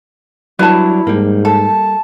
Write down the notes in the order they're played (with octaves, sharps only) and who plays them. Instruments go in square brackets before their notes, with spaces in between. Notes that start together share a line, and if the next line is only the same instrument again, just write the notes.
[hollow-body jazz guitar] F#3 G3 D4 [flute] E4 [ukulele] B4 A5
[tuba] G#2 [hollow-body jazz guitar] G3 A#3
[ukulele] A4 [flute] A5